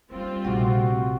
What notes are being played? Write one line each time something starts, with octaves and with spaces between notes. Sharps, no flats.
G3 A#3 C4 D#4 F4
A#1 C3 A3 F#4 G5